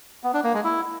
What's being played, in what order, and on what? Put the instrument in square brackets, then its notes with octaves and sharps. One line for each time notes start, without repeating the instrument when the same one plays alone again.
[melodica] B3
D4
A#3
G#3
E4